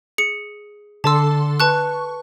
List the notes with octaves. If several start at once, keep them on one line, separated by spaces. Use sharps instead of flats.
G#4 C#7
D3 A4 A5 C6 E6
B4 A5 C#6 F#6